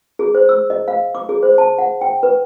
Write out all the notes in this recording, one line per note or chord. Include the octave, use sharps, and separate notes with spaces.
G#4
C5
E6
D#5
F5
D6
G#4
C5
A5
F#5
G5
B4